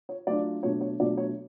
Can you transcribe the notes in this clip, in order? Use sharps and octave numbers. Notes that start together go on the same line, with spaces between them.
C#5
F#3 A3 D4 F4 D5
B2 F#3 A3 D4 C#5
C#5
B2 F#3 A3 D4 D5
C#5